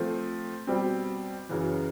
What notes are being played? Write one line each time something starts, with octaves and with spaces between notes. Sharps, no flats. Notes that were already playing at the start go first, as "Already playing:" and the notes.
Already playing: F3 A3 C4
B2 G3 C4
F#2 C#3 E3